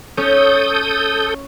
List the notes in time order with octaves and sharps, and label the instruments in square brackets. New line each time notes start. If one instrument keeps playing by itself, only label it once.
[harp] C#4 [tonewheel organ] A4 D#6 G6